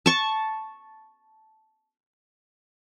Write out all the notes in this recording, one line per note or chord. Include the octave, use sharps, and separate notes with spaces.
A5 C#6